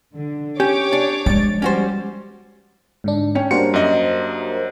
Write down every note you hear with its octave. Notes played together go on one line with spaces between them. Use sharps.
D3
C#4 G4 C#5 D6
D4
F3 G#3 A6
G3 C#4 F#4 C5
G#2 D3 D4
C#4 C#5 G5
G3 A#3 D4 F#4 A#4 C5 C#7
F#2 D#5